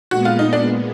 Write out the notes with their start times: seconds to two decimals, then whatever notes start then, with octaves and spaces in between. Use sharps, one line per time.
0.11 A#2 G#3 B3 F#4
0.25 F4
0.39 D#4
0.53 D4